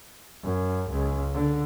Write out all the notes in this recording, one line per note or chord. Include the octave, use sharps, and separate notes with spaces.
F#2
C#2
D3